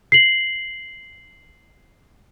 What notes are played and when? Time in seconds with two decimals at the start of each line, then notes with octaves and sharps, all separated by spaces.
0.12 C7 F#7